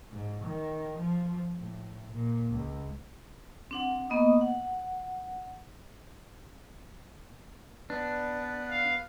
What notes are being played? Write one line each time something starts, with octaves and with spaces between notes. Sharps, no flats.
G#2
D#3
F3
A2
A#2
C#2
C4 D4 F#5
A#3 B3 D#5 D#6
F#5
B3 D4 B4
F5